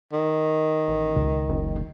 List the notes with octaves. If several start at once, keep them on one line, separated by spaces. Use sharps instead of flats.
D#3
A1
C#2
F#1